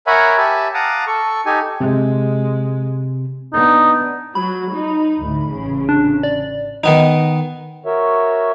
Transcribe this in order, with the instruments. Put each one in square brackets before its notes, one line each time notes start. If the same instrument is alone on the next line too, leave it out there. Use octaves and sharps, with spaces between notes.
[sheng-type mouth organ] A#4 C#5 E5 F#5 G#5 B5
G4 E5 G#5 A5 B5
F5 F#5 A5 A#5 D6 D#6
A4 C#6
D#4 G4 A4 G#5
[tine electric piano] C3 [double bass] G#3
[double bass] B3 D4 [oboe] D#4
[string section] F#3 [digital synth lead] B5
[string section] D#4
D2 A2
A1 C#3
[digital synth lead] D4
D5
[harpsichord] D#3 B3 D#4
[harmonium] F#4 A#4 C#5 E5